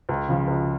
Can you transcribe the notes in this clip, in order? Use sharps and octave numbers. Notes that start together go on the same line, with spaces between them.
C#2
C#3 F3
C#2